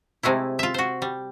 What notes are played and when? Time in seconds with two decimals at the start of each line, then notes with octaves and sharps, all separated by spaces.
0.23 C3 G#3 A3 E4
0.59 F4 E5
0.74 F#4 C5
1.02 G3